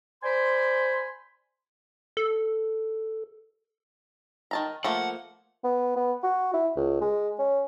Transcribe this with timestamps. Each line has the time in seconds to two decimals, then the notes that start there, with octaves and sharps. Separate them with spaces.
0.23 C5 D5 G#5 B5 C6
2.17 A4
4.51 D#3 A5 A#5
4.84 F3 A3 A#3 F#5
5.64 B3
5.96 B3
6.23 F#4
6.53 E4
6.76 C#2
7.01 G#3
7.39 C#4